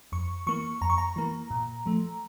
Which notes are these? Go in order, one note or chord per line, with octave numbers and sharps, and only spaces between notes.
F2 C#6
E3 A#3 C#6
F2 A#5
C#6
A#5
E3 A#3
A#2
F3 A3